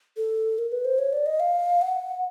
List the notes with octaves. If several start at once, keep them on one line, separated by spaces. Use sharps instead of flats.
A4
A#4
B4
C5
C#5
D5
D#5
F5
F#5